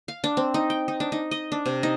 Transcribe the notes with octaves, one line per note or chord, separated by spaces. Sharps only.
F5
D4
C4
D#4
G5
D#4
D4
D#4
D#5
D4
C3
D#4